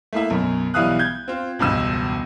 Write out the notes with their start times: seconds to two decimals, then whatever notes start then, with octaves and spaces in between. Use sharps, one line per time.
0.13 A3 A#3 E4 E5
0.30 B1 F#2
0.74 B1 E3 G3 F5 D#6 F#6
0.99 G6 G#6
1.28 C4 F4
1.59 E1 C#2 G2 E6